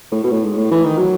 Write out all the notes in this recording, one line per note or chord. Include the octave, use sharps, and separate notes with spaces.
A2
B2
A2
G#2
A2
E3
D#3
F#3